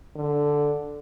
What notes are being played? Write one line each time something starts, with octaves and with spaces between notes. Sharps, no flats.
D3